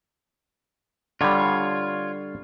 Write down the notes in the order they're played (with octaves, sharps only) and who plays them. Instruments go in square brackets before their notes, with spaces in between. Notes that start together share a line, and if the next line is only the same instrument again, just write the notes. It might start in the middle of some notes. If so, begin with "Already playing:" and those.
[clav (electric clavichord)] D3 G3 [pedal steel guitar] F4 C#5